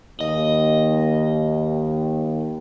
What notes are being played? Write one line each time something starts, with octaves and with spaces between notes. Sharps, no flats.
D#2 D#5